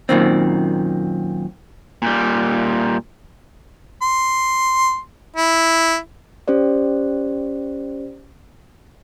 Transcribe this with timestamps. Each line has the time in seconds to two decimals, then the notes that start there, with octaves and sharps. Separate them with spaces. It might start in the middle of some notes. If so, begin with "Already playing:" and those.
0.09 F#2 A#2 D#3 C4
2.02 A#2 G3
4.02 C6
5.36 E4
6.48 C#4 G4 C5 D5